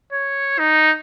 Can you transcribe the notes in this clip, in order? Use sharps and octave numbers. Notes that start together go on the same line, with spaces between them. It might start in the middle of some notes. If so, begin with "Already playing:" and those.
C#5
D#4